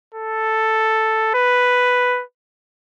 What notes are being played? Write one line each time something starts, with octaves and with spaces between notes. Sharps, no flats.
A4
B4